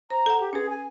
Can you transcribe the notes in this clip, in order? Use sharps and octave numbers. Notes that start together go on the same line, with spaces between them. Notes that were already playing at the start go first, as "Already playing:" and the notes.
C5 A#5
A4 F#5
G4
C#4 G#4 B4
G#5